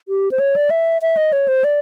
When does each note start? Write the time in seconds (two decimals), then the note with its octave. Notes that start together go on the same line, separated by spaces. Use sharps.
0.08 G4
0.31 C5
0.39 C#5
0.56 D5
0.70 E5
1.02 E5
1.17 D#5
1.33 C#5
1.48 C5
1.64 D5